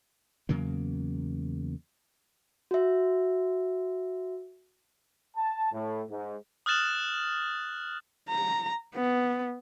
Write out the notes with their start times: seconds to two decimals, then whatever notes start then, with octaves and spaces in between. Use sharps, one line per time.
0.49 E2 C#3 F#3 A#3
2.71 F#4 E5
5.36 A5
5.72 A2
6.10 G#2
6.66 D#6 F6 F#6 A6 E7 F#7
8.29 A#5
8.94 B3